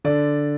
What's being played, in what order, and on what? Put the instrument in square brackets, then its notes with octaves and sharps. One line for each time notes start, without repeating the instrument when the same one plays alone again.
[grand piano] D3 D5